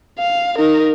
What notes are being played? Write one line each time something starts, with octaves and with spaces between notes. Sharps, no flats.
F5
D#4 A#4